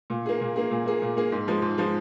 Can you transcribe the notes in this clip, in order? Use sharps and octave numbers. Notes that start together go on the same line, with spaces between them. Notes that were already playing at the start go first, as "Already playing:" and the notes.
A#2
A#3 G#4
A#2
A#3 G#4
A#2
A#3 G#4
A#2
A#3 G#4
G#2
F3 G#3
G#2
F3 G#3